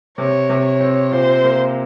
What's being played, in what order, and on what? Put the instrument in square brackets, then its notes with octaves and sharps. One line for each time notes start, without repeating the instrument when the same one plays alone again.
[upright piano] C3 [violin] C#5
[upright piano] C3
[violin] C#5
[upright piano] C4
[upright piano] A#2 [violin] C5
[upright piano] A#3